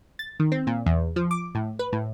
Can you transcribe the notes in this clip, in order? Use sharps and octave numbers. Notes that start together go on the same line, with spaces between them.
A6
D#3
C4
A#2
E2
F3
D6
A2
B4
A2